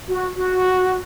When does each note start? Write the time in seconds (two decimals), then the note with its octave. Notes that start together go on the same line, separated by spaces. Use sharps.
0.08 F#4
0.36 F#4